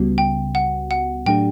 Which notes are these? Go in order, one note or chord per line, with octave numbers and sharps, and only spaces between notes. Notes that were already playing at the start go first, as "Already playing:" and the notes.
Already playing: C#2 C#3 G3 B3 F#4
G5
F#5
F#5
A2 F#3 A3 D4 G4 G5